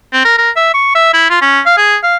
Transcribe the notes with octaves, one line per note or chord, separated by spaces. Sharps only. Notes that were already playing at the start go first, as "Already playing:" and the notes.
C4
A#4
A#4
E5
C#6
E5
E4
F4
C#4
F5
G#4
F5